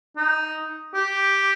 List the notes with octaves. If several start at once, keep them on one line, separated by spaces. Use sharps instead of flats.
D#4
G4